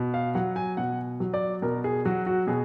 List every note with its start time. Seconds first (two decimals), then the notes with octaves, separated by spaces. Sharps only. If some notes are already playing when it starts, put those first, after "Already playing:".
Already playing: B2
0.14 F5
0.35 F#3 F#5
0.56 G#5
0.77 B2 F#5
1.20 F#3
1.34 D5
1.62 B2 A#4
1.84 G#4
2.05 F#3 F#4
2.26 F#4
2.47 B2 G#4